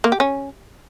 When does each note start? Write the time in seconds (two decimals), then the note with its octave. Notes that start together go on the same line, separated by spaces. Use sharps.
0.04 A#3
0.12 G4
0.20 C#4